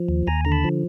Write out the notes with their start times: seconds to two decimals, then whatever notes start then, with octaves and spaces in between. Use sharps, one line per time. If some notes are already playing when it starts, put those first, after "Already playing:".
Already playing: F3
0.09 D#2
0.27 D#2 G#5 A#5
0.45 D3 A#5
0.52 A5 B5
0.64 F3